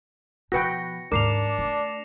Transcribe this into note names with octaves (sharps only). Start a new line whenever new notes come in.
B2 F3 F#4 B4 G5 A#6 C#7
D#2 G#2 D4 A#4 D6 C7 F7
A3